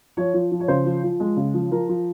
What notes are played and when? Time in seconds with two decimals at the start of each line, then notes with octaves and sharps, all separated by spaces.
0.17 F3 C#5
0.34 F3
0.52 F3
0.60 C#5
0.68 C#3 C5
0.85 F3
1.03 F3
1.20 G#3
1.37 C#3
1.54 F3
1.71 F3 A#4
1.89 F3